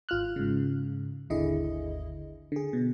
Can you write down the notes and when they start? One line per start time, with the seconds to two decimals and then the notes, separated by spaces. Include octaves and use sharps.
0.09 G#1 F4 F6 F#6
0.36 G#2 C#3
1.30 G#1 D#2 D3 E4 G#4 D#5
2.52 D3 G#4
2.73 B2